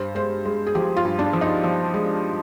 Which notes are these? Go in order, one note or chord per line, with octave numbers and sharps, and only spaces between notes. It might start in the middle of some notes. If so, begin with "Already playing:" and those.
Already playing: G2 C5
G#3 C5
G#3
G#4
F3 G4
F4
G2
D4
F3
D#4
F3
G#3